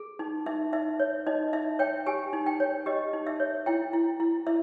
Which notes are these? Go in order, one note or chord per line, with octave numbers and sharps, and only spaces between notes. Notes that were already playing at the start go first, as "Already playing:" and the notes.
Already playing: G#4
D#4
D#4 E5
D#4 E5
C#5
D#4 D#5
D#4 E5
C#5 G5
G4 G#5
D#4
G5
C#5
G4 D#5
D#4
E5
C#5
E4 G5
E4
E4
E4 E5